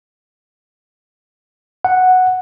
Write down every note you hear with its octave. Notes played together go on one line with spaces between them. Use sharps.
F#5